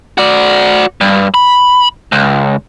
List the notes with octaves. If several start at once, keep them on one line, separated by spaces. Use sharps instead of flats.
F#4 D5
G2
B5
C#2